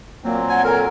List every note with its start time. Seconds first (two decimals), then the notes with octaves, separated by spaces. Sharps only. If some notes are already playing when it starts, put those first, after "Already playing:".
0.24 A#2 F#3 A#3 C4
0.49 F#5 G#5
0.65 A4 A#4